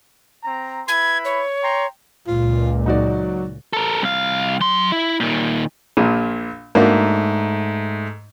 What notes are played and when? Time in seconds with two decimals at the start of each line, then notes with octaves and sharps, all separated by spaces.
0.43 C4 A#5
0.88 E4 B4 B5 G#6
1.25 C#5
1.63 G5 A#5 C6
2.27 C#2 A#2 F4
2.86 F#3 D#4 F#4 D5
3.73 A4 A#4
4.02 C2 F5
4.61 F#3 C6
4.92 E4
5.20 A#2 D#3
5.97 A#1 A#2
6.75 G#2 A3 A#3 D4 F#4